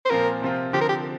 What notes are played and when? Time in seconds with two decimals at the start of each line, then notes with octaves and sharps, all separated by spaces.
0.05 C5
0.10 A#2 F3 C4 F4 A#4
0.42 C3 F3 C4 F4
0.73 D3 F3 C4 G4
0.81 A#4
0.89 G4